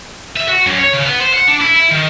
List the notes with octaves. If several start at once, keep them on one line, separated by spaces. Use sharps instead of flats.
E5
F#4
F#2
C#5
C#3
B3
C5
F#5
D4
E4
E4
D#3